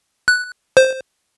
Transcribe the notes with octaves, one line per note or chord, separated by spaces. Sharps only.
F#6
C5